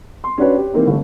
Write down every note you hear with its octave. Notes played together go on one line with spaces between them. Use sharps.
C6
C#4 D4 F#4 B4 C#5
G4
E3 A#3 C4 D#4
G1 A3